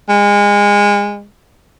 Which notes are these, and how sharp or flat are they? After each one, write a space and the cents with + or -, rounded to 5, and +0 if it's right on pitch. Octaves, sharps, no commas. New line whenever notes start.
G#3 -25